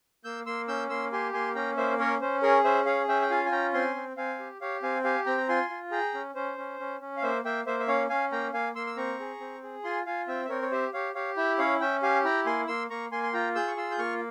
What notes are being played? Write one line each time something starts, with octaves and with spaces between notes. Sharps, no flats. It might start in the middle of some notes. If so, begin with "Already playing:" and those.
A#3 E6 G6
A#3 C6 E6
C#4 E6 G6
A#3 C6 E6
G4 G#5 C6
A#3 G#5 C6
C#4 G5 A#5
A#3 C5 E5
C#4 A#4 C#5
C#4 C5
G#4 A#4 C#5
C#4 C5 E5
G#4 C#5 F5
C#4 E5 G5
G5
F4 F5 G#5
G#5
C#4 G5 A#5
C4 G#5 C6
C4
C4 F5 G#5
G4
G4 C#5 F5
C4 F5 G#5
G4 F5 G#5
C4 G5 A#5
A#5
F4 G#5 C6
F4
G#4 G5 A#5
C#4
C#4 C5
C#4
C#4
C#4
F5
A#3 C5 E5
A#3 E5 G5
A#3 C5 E5
E5
C#4 C#5 F5
C#4 F5 G#5
A#3 G5 A#5
A#3 F5 G#5
A#3 C6 E6
E6
C4 A#5 C#6
G#4
C4
G#4
F4 G#5 C6
F4 F5 G#5
C4 E5 G5
E5
C4 A#4 C#5
C#5
G4 C5 E5
G4 C#5 F5
G4 C#5 F5
E4 E5 G5
C#4 C#5 F5
C#4 E5 G5
G4 F5 G#5
E4 G5 A#5
A#3 G#5 C6
A#3 C6 E6
A#3 A#5 C#6
A#3 G#5 C6
C6
F4 G5 A#5
G#4 E6 G6
C#6
F4 C6 E6
G6
A#3 C#6 F6